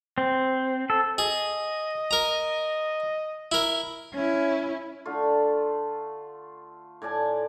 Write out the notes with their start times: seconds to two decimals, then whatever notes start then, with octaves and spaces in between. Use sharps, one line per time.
0.18 C4
0.90 A4
1.18 G#4 D#5
2.11 A#4 A#5
3.52 E4 A#4
4.13 C#4 E4
5.05 D3 A3 F4
7.02 A2 D5 G#5 A5